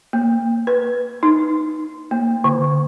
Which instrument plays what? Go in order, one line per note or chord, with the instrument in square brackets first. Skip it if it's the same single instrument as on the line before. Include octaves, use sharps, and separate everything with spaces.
[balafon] A#3
B4
D#4
A#3
D3